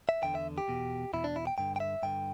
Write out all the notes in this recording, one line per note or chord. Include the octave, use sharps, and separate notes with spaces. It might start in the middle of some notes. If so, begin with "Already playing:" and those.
E5
E2 D3 G5
E5
G4
E2 B2
E2 B2 E4
D4
E4
G5
G2 D3 G5
G5
E5
G2 D3 G5